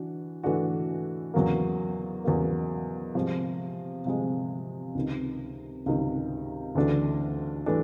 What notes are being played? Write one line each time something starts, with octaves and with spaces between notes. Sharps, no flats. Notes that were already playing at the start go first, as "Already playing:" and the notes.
Already playing: E3 D4 F#4
E3 A3 D4 F#4
E2 C#3 F#3 A#3
E2 C#3 F#3 A#3
C3 F3 G#3
C3 F3 G#3
C#2 C3 D#3
C#2 C3 D#3
D2 C#3 E3 A3 D4
E3 A3 D4